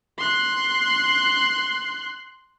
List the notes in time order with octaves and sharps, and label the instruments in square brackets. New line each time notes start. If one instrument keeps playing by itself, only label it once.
[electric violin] C6 F#6